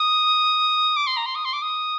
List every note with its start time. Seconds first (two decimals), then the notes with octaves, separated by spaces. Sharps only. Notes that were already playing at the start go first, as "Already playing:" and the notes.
Already playing: D#6
0.96 D6
1.06 C6
1.16 A#5
1.26 C6
1.35 D#6
1.45 C6
1.53 D6
1.62 D#6